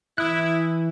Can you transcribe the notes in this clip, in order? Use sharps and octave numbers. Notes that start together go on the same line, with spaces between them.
E3 E4 D#6 F#6